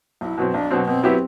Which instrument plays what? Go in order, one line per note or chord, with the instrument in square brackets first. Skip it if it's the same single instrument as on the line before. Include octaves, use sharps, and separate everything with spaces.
[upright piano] B1 [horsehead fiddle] E4
[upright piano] B2 F#3 C4
[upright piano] B1 [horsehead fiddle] D4
[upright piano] B2 F#3 C4
[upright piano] B2 [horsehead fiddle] C4
[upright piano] F#3 B3 E4 G4